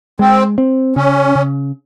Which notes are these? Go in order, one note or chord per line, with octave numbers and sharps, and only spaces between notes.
G#3 C4
C4
C#3 C#4
C#3